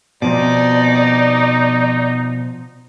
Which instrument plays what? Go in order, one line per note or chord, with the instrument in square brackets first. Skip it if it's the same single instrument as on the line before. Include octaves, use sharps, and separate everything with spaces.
[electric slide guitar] B2 F3 C4 [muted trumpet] D#4 [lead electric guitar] D5